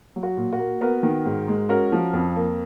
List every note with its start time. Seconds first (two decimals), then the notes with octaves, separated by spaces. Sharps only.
0.16 F#3
0.23 F#4
0.37 A#2
0.53 F#4
0.59 A#3
0.81 B3 F#4 A#4
1.03 D#3
1.25 G#2
1.48 G#3
1.69 C#4 F#4 A#4
1.92 F3
2.13 F2
2.36 A#3